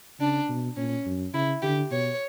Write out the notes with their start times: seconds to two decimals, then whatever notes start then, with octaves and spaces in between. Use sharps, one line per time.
0.20 C#3 D4
0.49 B2
0.76 A#2 C#4
1.06 F#2
1.34 C#3 E4
1.62 D3 G4
1.91 B2 C#5